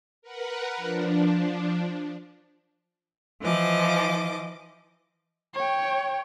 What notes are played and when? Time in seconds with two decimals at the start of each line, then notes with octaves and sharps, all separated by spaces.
0.22 A#4 B4 F#5
0.77 F3 D4
3.41 E3 F3 D#5 D6
5.55 C#5 G5